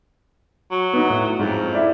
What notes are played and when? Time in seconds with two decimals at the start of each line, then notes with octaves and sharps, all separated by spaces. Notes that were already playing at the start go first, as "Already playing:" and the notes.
0.71 F#3
0.94 B3 D#4
1.10 A2
1.39 F2 G#2
1.73 E4 D5 E5